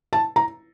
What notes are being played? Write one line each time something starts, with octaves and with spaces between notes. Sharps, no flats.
A5
A#5